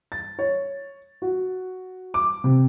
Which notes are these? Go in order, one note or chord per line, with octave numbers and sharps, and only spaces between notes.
A6
C#5
F#4
D6
C3